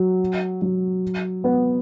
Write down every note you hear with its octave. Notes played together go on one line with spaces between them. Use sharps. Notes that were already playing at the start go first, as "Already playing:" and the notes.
Already playing: F#3
F#3
B3